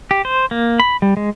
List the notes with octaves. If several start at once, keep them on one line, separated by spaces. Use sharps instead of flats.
G4
C5
A#3
B5
G3
G#3